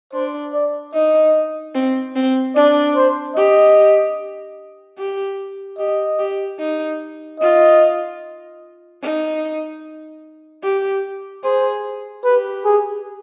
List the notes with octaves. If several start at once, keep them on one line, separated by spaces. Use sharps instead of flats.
D4 C5
D5
D#4 D#5
C4
C4
D4 D5
C5
G4 D#5
G4
G4 D#5
G4
D#4
F4 D#5
D#4
G4
G#4 C5
G4 B4
G#4